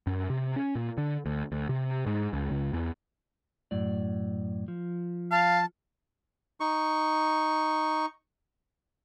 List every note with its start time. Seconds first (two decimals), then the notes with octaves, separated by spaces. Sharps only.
0.07 F#2
0.30 C3
0.56 C#4
0.75 A#2
0.98 D3
1.26 D2
1.52 D2
1.69 C3
2.06 G#2
2.33 C#2
2.51 C#2
2.73 E2
3.71 F#2 A2 D5
4.68 F3
5.31 F5 A5
6.60 D#4 C#6